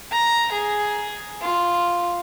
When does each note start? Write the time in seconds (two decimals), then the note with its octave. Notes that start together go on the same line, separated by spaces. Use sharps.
0.12 A#5
0.52 G#4
1.41 F4